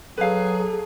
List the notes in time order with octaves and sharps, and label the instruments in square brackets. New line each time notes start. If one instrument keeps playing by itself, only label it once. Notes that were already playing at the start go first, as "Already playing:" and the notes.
[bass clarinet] F#3 [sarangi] G#4 [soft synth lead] A4 [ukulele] B4 F5